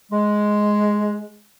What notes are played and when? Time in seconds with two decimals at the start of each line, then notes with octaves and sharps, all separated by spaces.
0.12 G#3